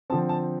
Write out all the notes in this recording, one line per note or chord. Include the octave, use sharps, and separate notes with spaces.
D3 F3 C4 A5
A5